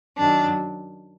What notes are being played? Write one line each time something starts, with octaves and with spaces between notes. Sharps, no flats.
F#2 D#3 F#3 D4